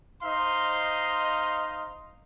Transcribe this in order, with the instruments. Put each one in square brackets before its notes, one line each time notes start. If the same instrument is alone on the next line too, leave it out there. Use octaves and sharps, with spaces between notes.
[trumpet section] D#4 C5 D#5 F5 C6